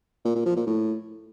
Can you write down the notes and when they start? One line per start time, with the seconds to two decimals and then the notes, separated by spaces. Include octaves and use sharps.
0.25 A#2
0.35 A#2
0.46 F3
0.56 A#2
0.67 A2